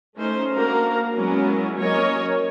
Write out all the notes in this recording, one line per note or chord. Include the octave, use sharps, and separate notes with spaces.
A3 C#4 D#4 C5
A#3 D4 F#4 A#4 F5 A#5
F#3 G#3 B3 C#4 E4 A#4
F#3 A#3 C#4 A#4 C#5 D#5